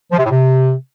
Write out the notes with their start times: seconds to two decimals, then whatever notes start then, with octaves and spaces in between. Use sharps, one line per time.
0.11 F3
0.18 C3
0.24 A2
0.31 C3